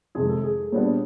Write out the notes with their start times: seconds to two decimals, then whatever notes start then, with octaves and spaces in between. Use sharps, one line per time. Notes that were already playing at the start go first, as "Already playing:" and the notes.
0.15 F2 C3 D#3 G#3 G#4
0.29 A4
0.43 G#4
0.72 A#2 G3 B3 D4